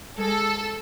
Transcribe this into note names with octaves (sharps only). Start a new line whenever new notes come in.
G#3 A4